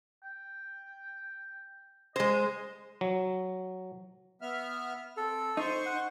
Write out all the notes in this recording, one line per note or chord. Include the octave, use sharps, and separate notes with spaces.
G5
G#3 C5 D#5
F#3
B3 E5 F6
C4 A4
D#4 C5 C6 C#6
F#5